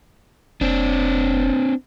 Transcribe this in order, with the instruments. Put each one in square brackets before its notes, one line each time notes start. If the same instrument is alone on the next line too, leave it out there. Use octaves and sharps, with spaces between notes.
[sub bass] F1 [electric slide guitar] C4 D4